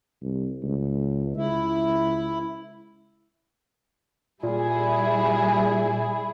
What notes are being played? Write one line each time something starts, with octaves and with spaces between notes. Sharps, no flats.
C2
C#2
C#2 E4
A#2 G3 E4 G#4